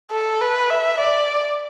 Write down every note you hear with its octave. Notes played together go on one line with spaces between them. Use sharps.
A4
B4
E5
D5